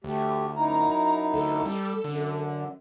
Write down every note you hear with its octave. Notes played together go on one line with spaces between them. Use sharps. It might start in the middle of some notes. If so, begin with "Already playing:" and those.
D2 A3 G4
F#2 D#4 E4 A#5
D2 A4
G3
F#2 D3